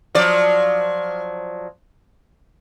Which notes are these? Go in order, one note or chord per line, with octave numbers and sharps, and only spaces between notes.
F3 F#3 D5